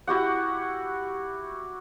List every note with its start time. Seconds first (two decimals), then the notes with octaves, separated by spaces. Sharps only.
0.07 E4 F#4 G4 F#5